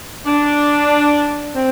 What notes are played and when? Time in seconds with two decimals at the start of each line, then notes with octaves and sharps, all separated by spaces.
0.25 D4
1.55 C4